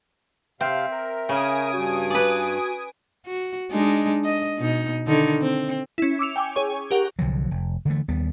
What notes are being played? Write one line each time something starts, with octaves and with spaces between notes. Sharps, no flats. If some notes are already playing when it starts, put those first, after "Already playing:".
C3 C4 E5 F5
A#4
C#3 G#5 D#6 D7
G2 F#4
B4 D5
F#4
G#3 D4 D#4
D#5
B2 D#4
D3 D#3 D#4
C4
C#4 E4
D6 E6 C#7 F7
G5 G#5 D6
G#4 C#5 C#6
G4 A#4 F#5
C2 D3 F3 F#3
F1
D3 E3 A3
D#2 G3 B3